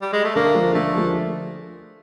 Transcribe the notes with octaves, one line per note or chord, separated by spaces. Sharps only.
G3
G#3
A3
D3 A#3
F3 G#3
D3 A3
F3 G#3